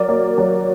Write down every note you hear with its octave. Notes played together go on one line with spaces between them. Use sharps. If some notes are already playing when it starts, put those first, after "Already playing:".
Already playing: F#3 A#4 D5
A#3
F#3